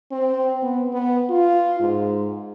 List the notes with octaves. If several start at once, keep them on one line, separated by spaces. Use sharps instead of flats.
C4
B3
B3
F4
G#2